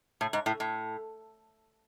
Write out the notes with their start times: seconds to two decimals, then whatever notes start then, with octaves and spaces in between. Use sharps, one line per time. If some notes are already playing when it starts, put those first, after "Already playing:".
0.21 A2
0.33 G#2
0.46 A2
0.60 A2